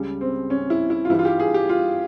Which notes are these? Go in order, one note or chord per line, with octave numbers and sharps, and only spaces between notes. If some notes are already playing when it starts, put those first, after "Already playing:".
Already playing: C#2 C#3 G3
C4
C#4
E4
E4
F4
G2 E3 G3 E4
F4
G4
G#4
G4
F4